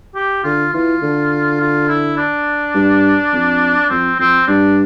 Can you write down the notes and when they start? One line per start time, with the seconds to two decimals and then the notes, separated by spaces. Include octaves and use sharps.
0.15 G4
0.44 D3 F4
0.73 E3 F4
1.02 D3
1.60 F4
1.89 E4
2.18 D4
2.74 G2
3.33 F2
3.90 F2 C4
4.19 F2 C4
4.47 G2 D4